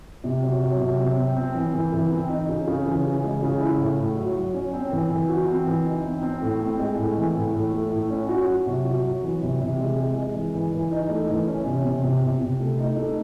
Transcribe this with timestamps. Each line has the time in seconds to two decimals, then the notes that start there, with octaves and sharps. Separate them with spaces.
0.24 C3
0.43 F#3
0.62 F#3
0.80 C3
0.99 C4
1.17 C4
1.37 C4
1.54 E3
1.74 E3
1.93 E3
2.11 C4
2.29 D#4
2.49 C#3
2.67 C#3
2.86 E3
3.05 C#3
3.23 G#3
3.42 C#3
3.60 E4
3.79 A2
3.98 A2
4.17 F#3
4.36 F#3
4.54 C#4
4.73 C4
4.92 E3
5.10 E3
5.29 F#4
5.48 C4
5.66 E3
5.85 D#4
6.05 C4
6.23 C4
6.41 A2
6.60 C4
6.79 G#3
6.98 A2
7.17 E3
7.35 A2
7.54 A2
7.72 A3
7.92 A2
8.10 C#4
8.29 F#4
8.48 F#3
8.66 C3
8.85 F#4
9.04 F#3
9.23 E3
9.42 C3
9.60 C3
9.79 G#3
9.97 G#3
10.16 G#3
10.35 E3
10.54 E3
10.73 E3
10.91 D#4
11.09 A3
11.29 E3
11.47 C#4
11.66 C3
11.84 C3
12.04 C3
12.22 C3
12.41 C3
12.60 A3
12.79 D#4
12.97 A3